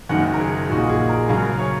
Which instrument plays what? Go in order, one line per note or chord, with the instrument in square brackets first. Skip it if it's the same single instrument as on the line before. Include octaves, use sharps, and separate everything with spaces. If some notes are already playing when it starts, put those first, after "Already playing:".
[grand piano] F#1 F#2 D#3 F#5
A#4
G#4
A#1 A#2 A#3 D#4 F#4
G#4
A#4
F#2 C#3 F#3 C#4 G#4
A#4
C#5